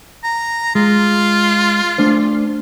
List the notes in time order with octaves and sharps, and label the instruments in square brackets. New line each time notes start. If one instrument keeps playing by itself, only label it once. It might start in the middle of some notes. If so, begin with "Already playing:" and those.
[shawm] A#5
[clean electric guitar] G#3 [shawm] F4
[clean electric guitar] A3 D4 C5